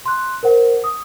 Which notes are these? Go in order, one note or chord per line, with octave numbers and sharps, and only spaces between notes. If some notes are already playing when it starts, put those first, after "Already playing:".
C6 F#6
A#4 C5 F#5
D#6